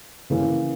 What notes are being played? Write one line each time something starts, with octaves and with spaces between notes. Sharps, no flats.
C#3 E3 A#3 C#4